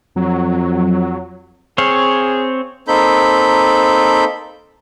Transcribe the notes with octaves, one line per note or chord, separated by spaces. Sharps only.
F2 F#3
C4 G#4 C#5 F5
A#3 C4 D#4 A4 B5 G6